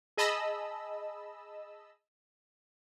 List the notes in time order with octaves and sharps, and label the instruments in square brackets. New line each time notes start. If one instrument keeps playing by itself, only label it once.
[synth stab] G#4 D#5 A5 B5 E6